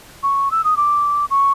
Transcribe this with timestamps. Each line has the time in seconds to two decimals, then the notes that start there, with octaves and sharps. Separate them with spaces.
0.23 C#6
0.51 E6
0.64 D#6
0.77 D6
1.31 C#6